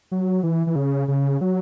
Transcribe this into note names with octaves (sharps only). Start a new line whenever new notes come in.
F#3
E3
E3
C#3
C#3
F#3